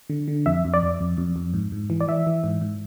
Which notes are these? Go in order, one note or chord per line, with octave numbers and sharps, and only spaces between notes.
D3
D3
F2 E5
F2
D5
F2
F2
F2
F2
G#2
G#2
E3
D5
E3 E5
E3
G#2
G#2